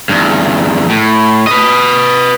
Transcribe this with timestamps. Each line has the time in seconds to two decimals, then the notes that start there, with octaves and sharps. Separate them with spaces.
0.09 E2 G2
0.90 A2
1.47 B4 D#5